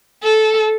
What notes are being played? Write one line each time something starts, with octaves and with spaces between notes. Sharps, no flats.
A4